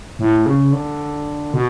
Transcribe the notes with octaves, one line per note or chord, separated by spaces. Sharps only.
A2
C#3
D3
B2